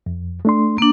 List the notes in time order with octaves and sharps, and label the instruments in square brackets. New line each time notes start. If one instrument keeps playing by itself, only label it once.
[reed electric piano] F2
A3 D4 C6
[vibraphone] A#3 D4